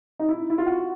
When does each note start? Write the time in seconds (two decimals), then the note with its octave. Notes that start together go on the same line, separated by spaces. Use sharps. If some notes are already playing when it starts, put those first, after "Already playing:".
0.19 D#4
0.28 E4
0.50 E4
0.58 F4
0.66 F#4